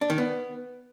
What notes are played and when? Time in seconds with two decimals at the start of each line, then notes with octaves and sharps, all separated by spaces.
0.01 D4
0.10 D#3
0.18 B3